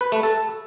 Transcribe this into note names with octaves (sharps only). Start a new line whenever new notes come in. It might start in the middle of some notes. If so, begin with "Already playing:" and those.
B4
A3
A4